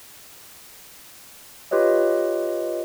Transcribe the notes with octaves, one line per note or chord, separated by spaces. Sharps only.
F4 G4 B4 C#5 D#5